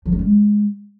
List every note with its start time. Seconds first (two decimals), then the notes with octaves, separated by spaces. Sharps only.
0.06 F3
0.12 C#4
0.19 G#3